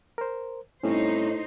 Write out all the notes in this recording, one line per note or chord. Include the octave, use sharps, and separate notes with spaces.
A#4 C5
A2 G3 C4 C#4 D#4 C5